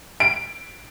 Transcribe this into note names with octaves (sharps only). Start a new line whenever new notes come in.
D7